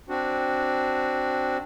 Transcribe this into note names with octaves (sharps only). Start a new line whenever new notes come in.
C4 D4 F#4